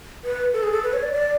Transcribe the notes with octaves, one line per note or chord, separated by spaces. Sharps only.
B4
A4
G#4
A4
B4
C#5
D5
D5